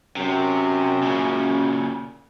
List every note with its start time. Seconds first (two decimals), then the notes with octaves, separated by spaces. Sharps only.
0.16 F#2 C3
1.03 A#2 C#3